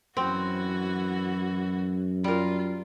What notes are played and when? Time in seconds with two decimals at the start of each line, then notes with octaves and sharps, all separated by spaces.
0.17 F#2 E3 C4 F#4
2.24 G3 F4 A#4